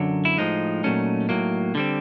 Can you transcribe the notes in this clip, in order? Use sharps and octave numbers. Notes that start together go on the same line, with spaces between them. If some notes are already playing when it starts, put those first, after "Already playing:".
Already playing: F#2 D3 F#3
E4
A2 F3 G#3 D#4
A#2 F#3 A3 C#4
A2 F#3 A#3
D3 G3 C4